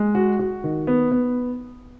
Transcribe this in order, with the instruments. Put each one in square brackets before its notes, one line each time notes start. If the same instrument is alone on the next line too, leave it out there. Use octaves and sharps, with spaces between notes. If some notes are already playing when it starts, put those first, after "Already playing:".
Already playing: [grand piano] G#3
F#4
F#4
D#3
B3
B3